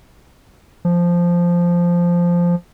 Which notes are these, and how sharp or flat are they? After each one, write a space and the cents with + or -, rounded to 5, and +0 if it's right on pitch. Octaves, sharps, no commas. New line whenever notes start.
F3 -5